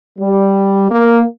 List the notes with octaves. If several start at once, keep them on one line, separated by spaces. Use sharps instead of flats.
G3
A#3